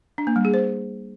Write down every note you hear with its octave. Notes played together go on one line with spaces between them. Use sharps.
D4
A#3
G3
G#4
C5